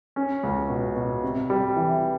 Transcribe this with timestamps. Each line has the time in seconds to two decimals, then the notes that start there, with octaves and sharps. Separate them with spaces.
0.16 C#4
0.43 C#2
0.69 B2
0.96 B2
1.23 C3
1.50 G3
1.76 E3